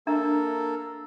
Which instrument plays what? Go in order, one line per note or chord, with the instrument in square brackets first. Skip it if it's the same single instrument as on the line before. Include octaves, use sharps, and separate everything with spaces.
[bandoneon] A#3 A4 [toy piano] D4 E5 A#5